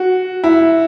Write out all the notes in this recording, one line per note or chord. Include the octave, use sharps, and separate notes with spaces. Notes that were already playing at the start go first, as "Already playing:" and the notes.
Already playing: F#4
E4